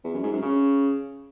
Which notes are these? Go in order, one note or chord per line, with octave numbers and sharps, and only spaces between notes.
E2
F#2
G#2
F#2
C#3